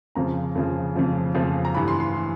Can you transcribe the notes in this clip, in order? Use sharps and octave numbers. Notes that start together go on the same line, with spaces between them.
F2 C#3 F3 A#5
F2 C#3 F3
F2 C#3 F3
F2 C#3 F3
A#5
G2 E3 B5
C6
C6
E3